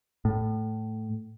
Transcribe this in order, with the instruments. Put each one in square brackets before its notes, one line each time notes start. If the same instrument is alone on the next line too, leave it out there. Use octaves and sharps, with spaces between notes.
[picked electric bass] A2